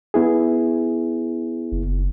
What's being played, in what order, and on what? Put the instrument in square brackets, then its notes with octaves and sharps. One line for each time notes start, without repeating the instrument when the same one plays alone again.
[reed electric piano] B3 E4 G#4
[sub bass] F#1